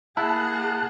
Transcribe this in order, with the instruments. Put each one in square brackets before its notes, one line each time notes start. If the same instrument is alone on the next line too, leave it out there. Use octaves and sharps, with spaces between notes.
[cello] A#3 G#4 [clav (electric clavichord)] E4 [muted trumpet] F#5 [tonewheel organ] A5 F#6